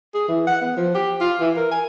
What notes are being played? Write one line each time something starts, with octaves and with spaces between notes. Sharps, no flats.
G#4
E3
F#5
B3
F3
G4
F4
E3
A#4
G#5